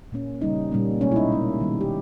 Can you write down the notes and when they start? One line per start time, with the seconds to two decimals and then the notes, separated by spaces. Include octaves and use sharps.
0.12 A#2 A#3 C#4
0.42 C#3 G3 C#4 D#4
0.72 A#2 G3 A#3 C#4
1.01 B2 G#3 C#4
1.12 E4
1.16 D#4
1.31 A#2 A#3 C#4
1.60 D#3 G3 B3
1.81 G4